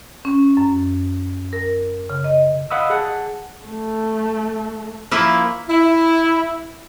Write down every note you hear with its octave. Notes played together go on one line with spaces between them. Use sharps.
C#4
F#2
A#4
C#3
D#5
D#5 F5 F#5 B5 D#6 E6
G#4 F#5 A5
A3
F3 A#3 E4
E4